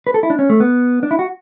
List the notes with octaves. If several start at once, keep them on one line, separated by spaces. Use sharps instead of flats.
B4
A4
E4
D4
C#4
A3
B3
D4
E4
F#4